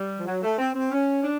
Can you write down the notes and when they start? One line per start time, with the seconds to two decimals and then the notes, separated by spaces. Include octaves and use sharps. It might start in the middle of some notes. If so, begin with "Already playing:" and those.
Already playing: G3
0.16 F3
0.27 F#3
0.42 A3
0.58 C4
0.74 C4
0.91 C#4
1.23 D4